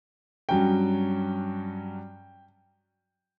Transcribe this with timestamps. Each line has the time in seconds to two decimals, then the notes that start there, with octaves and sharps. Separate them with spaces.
0.49 G2 F#3 C#4 G5